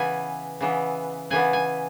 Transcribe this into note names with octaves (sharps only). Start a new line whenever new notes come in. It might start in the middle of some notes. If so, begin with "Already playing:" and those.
Already playing: C#3 E3 B3 G#5
C#3 E3 B3
C#3 E3 B3 G#5
G#5